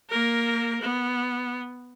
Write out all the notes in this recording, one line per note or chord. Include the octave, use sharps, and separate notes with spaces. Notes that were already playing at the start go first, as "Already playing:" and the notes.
A#3 A#4
B3